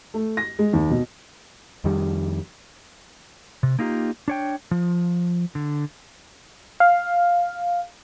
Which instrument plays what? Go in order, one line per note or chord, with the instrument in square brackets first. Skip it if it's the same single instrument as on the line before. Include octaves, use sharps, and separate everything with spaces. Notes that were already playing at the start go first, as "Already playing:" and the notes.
[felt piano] A3
A#6
G#3
D#2
B2
[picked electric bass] F2 D#3 G3
[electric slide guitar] C3
A#3 D#4 F4 G4
D4 C#5 G5
F3
D3
[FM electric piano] F5